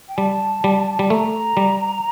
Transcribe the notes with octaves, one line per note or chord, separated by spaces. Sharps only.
G5
G3 A5
G3
G3
A3 A#5
G3